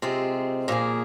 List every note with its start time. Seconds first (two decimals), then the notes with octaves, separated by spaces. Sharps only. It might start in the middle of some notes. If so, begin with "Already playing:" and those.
0.02 C3 G#3 C4 F4
0.68 A#2 F3 A#3 G#4